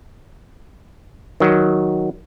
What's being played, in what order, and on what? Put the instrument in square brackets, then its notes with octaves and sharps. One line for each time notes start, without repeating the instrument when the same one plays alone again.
[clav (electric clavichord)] D#3 F#3